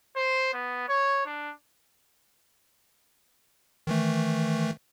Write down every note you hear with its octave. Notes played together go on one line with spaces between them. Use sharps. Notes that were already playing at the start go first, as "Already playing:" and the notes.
C5
B3
C#5
D4
D#3 E3 A3